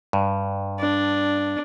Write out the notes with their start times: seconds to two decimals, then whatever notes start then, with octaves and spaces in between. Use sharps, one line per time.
0.13 G2
0.79 D4